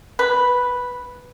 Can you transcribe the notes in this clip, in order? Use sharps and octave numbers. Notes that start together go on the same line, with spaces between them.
B4